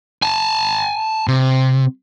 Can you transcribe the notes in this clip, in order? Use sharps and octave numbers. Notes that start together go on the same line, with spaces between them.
G#5 A5
C3